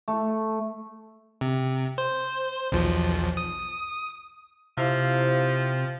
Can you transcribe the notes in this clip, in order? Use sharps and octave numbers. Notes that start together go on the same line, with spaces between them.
A3
C3
C5
B1 E2 F3
D#6
C3 F3 E4 C5 F5